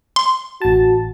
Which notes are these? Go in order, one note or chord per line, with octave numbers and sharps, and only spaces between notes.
C6
A1 F#4 A5